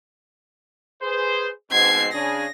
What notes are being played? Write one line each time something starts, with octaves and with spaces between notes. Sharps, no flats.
G#4 B4 C5
G#2 B2 C4 G#6 C7
C#3 D4 G#4 A#6